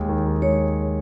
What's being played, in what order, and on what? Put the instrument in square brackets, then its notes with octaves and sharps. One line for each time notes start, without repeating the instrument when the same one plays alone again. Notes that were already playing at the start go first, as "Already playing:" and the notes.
Already playing: [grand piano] D#2 G#3
D#3
D#2
[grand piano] G#3 [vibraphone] C#5